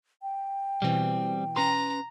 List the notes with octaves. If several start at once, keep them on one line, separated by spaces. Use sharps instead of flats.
G5
B2 E3 G3 C4
C#4 B4 A#5 C6